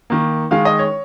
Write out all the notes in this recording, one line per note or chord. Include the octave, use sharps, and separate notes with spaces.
D#3 A#3
D#3 G#3 F5
D#5
C#5